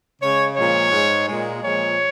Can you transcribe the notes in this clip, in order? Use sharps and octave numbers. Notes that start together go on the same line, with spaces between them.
C#3 G#3 C#5
A#2 F3 G#3 C#5
G#2 G#3
A#2 G#3
A#2 F3 G#3 C#5